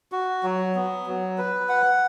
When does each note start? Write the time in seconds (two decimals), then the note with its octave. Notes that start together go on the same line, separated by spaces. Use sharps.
0.12 F#4
0.43 F#3
0.75 B3
1.06 F#3
1.38 B4
1.69 F#5